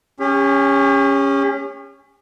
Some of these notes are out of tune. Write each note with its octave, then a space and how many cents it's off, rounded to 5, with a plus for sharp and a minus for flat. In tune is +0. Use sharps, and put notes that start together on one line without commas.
C#4 +0 G4 +45